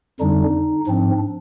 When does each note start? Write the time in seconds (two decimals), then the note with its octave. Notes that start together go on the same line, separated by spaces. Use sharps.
0.20 F2 D3 G3 D4 D#4
0.87 G#2 F3 C4 D4